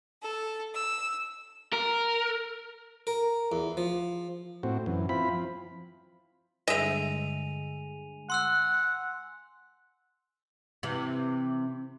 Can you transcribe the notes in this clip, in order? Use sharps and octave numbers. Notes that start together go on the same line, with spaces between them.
A4
E6
A#4
A#4
E2
F3
A2 C4 F#4
F#2 E3
C4 E4 F4 B5
F3
G2 D3 G#3 D#5 E5 G#5 D#7 F7
F#5 C6 E6 F#6
C3 E3